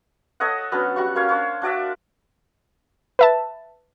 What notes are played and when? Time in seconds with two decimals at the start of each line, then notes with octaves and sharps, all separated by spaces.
0.40 A4 C#5 D#5 F#5
0.72 F#3 B3 C#4 D4
0.96 G3 F#4 F#5 C#6
1.16 A#3 C#4 C#5 F5
1.29 D4 C5 C#5
1.62 D4 F#4 D5 E5
3.19 B4 E5 A5